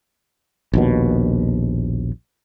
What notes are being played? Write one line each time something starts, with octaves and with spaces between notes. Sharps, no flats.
A#1 D#2 B2